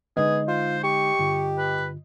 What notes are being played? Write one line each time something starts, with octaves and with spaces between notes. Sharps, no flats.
D3 G#3 B3 D#4 G#4 D#5
F4 C5
G4 C#6
G2 D3 F4
B4